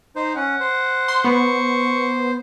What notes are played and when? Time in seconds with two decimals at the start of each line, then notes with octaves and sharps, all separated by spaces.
0.16 D#4 C5
0.36 C#4 F#5
0.60 C5
1.08 C6
1.24 B3 C#6